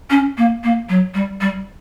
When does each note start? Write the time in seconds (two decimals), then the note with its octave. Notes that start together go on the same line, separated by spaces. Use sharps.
0.10 C#4
0.38 A#3
0.64 A#3
0.89 F#3
1.15 G3
1.41 G3